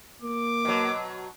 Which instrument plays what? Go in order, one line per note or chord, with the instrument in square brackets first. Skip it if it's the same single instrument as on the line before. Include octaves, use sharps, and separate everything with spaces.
[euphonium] A#3 [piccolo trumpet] D6
[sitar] B2 F#3